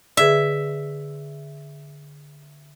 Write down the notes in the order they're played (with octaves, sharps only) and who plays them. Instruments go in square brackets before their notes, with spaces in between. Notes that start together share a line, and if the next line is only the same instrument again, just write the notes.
[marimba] D3 G#4 B4 [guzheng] E5